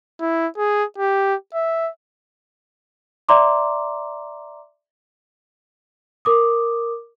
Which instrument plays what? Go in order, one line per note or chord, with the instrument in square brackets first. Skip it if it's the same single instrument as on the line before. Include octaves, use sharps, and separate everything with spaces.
[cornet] E4
G#4
G4
E5
[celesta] D5 E5 A#5 C6 D6
A#4 D6 D#6